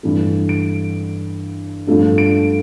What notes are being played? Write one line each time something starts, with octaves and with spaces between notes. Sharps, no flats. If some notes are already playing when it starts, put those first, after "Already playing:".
G2 E3 A3
D7
G2 F3 A3 D4
D7